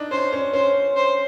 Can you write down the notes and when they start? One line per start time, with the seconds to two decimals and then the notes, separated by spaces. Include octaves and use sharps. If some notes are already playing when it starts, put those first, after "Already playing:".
Already playing: D4 D#4
0.11 C#4 C5
0.33 C#4
0.53 C#4 C5
0.96 C5